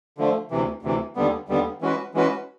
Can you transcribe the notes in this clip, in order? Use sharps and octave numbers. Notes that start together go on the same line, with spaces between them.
D3 F3 A3
D2 C3 E3
D2 C3 E3
D#2 D3 G3 B3
D#2 D3 G3 B3
E3 G#3 C#4 F#4 B4
E3 G#3 C#4 F#4 B4